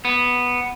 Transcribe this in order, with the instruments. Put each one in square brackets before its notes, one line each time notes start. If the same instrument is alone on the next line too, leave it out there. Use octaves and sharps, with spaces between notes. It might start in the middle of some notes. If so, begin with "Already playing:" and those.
[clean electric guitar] B3